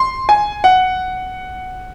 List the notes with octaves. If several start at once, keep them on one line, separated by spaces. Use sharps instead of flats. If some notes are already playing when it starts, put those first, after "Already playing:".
Already playing: C6
G#5
F#5